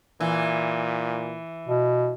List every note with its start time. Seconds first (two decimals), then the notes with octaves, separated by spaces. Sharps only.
0.20 A#2 E3
1.68 B2